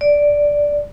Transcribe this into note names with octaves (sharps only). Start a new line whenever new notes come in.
D5